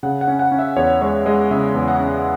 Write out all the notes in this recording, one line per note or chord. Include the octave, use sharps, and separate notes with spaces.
C#3 F#5
F#5
C#4
F#5
C#4
E5
E2 C#5
G#3 C#5
G#3 D#5
C#3 E5
E2
F#5
C#4